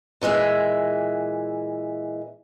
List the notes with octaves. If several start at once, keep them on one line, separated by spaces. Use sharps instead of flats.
A#2 E3 G#3 E5